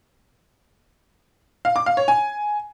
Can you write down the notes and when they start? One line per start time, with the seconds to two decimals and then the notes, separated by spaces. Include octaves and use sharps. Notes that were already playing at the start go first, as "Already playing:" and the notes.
1.65 F5
1.76 D6
1.86 F5
1.97 C#5
2.08 G#5